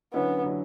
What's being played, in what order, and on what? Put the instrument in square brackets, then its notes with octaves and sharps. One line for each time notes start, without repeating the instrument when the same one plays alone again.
[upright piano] D3 F#3 C#4 E4 [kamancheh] B3
[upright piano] D3 F#3 C#4 E4